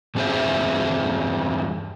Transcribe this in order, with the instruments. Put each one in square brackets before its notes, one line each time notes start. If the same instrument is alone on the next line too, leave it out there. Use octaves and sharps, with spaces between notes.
[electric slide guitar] E2 G2 C4 G#4 C5 E5